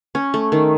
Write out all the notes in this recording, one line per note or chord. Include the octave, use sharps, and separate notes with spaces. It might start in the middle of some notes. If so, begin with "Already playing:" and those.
C#4
A3
D#3